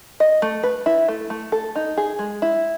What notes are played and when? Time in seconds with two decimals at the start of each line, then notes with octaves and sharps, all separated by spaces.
0.20 D#5
0.42 A3
0.63 B4
0.86 E4
1.08 A3
1.30 A3
1.52 A4
1.76 D#4
1.97 G#4
2.19 G#3
2.42 E4